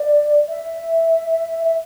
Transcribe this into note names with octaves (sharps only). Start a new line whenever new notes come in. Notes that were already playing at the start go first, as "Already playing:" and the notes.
Already playing: D5
E5
E5